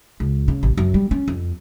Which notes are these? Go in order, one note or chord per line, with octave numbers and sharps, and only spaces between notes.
C#2
C#3
A1
F#2
G3
C#4
F2